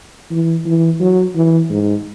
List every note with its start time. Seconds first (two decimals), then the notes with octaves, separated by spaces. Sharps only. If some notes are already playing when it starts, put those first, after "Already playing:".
0.31 E3
0.66 E3
1.00 F#3
1.35 E3
1.70 G#2